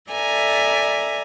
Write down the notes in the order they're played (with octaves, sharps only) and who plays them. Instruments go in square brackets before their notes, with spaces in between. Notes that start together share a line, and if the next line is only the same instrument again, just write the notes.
[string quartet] A4 D5 E5 G#5 A#5